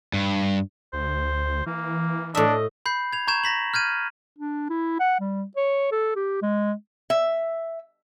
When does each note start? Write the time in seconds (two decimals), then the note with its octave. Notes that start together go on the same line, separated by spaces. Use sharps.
0.14 G2
0.93 D2 C5
1.66 E3 A#3
2.35 A2 D4 D#5 E5
2.86 B5 G6 C7
3.13 G#6 F7
3.27 A#5 C#6 G6 G#6 E7
3.44 A#5 A#6 B6 F#7
3.74 F6 G6 G#6 D#7
4.39 D4
4.69 E4
5.00 F#5
5.20 G3
5.57 C#5
5.91 A4
6.16 G4
6.42 G#3
7.10 E5